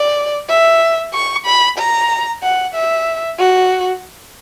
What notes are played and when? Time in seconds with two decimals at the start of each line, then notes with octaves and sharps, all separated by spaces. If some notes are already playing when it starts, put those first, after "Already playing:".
Already playing: D5
0.49 E5
1.14 C#6
1.46 B5
1.78 A#5
2.43 F#5
2.75 E5
3.39 F#4